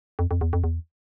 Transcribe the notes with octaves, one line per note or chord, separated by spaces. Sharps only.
F2
F2
E2
F2
E2